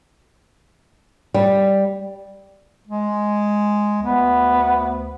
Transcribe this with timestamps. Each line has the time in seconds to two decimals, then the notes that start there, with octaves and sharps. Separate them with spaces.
1.34 G3
2.87 G#3
4.03 D2 B3